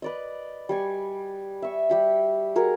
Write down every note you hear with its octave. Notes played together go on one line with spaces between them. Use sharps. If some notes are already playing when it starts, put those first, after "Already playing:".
B4 D5 D#5
G3 G#5 C#6
E5 C#6
G3 G4 B5
F#4 G#4 A#4